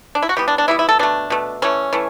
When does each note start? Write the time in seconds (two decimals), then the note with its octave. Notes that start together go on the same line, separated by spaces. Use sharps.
0.15 D4
0.22 E4
0.29 F#4
0.36 E3 G3 B3 G4
0.48 D4
0.58 D4
0.68 E3 G3 B3 E4
0.79 E4
0.89 A4
0.99 B2 A3 D4
1.30 B2 A3
1.62 E3 A3 C#4
1.93 E3 A3